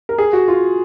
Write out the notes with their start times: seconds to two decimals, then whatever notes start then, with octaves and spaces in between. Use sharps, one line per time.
0.09 A#4
0.18 G#4
0.33 F#4
0.48 F4